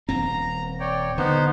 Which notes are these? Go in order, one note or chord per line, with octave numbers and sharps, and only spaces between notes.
D#1 C4 A#5
C#5 D5 G5
D3 B3 D#4 C5